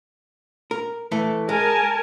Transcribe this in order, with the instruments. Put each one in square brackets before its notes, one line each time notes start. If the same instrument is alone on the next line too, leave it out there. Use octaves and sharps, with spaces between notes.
[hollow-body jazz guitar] A#4
E3 A3 A4
[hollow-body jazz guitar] G#3 [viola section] A#4 G#5 A5